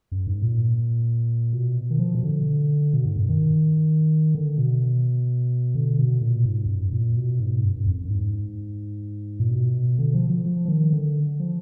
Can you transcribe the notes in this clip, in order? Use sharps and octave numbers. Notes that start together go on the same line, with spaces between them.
F#2
G#2
A#2
B2
D#3
F3
B2
D3
B2
G#2
F#2
D#3
D3
B2
D3
B2
A#2
G#2
F2
F#2
A#2
B2
G#2
F#2
F#2
F2
F#2
G#2
A#2
B2
D3
F3
F3
F3
F3
D#3
D3
F3